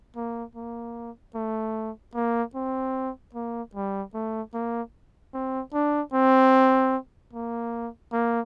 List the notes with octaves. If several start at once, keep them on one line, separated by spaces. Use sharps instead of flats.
A#3
A#3
A3
A#3
C4
A#3
G3
A3
A#3
C4
D4
C4
A#3
A#3